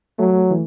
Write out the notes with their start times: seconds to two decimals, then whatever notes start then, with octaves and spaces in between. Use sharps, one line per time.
0.19 F#3 A3
0.51 E3